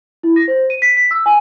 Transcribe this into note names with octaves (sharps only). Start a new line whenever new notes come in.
E4
A#6
C5
D#7
B6
B6
E6
G#5